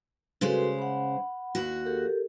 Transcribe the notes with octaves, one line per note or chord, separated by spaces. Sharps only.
C#3 G#3 F#4 A4 B4 C5
F#5 B5
D#2 F#4
G4 A4 A#4